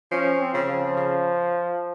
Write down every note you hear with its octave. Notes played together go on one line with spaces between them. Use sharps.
F3 C#4
C4
C#3
F3
C#3